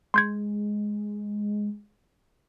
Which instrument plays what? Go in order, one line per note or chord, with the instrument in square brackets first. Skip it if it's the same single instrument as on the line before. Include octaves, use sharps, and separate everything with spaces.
[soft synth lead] G#3 [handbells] C6 G6 G#6